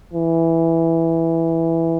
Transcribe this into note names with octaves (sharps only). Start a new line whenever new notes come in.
E3